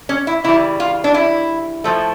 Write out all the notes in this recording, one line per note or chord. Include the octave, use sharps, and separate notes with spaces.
C#4
E4
C#3 E3 G3 E4
F4
D4
E4
A2 F3 A3